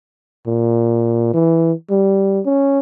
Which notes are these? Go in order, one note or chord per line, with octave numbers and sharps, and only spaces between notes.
A#2
E3
G3
C#4